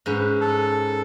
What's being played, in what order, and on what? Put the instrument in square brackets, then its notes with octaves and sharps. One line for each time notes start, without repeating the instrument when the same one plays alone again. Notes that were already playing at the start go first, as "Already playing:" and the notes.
[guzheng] G#2 C#4 B4
[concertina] A4